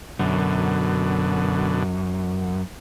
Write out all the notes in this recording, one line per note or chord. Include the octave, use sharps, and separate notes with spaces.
F#2 B2 D3